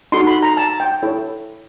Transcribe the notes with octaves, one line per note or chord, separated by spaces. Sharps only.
D#4 F#4 A4 C6
B5
A#5
A5
G5
E4 A4 C#5